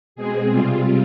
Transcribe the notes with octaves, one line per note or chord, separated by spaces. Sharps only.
B2 G#3 C4 G#4
C3 G3 C4 F4